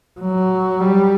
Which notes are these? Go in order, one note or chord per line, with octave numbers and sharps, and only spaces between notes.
F#3
G3